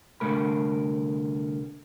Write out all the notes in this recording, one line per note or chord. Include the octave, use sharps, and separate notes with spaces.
C2 D3 F3 A3 A#4 B5